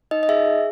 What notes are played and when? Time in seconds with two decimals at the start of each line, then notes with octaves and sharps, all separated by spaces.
0.11 D#4 D#5
0.23 D#5
0.29 G#4 E5
0.46 G#4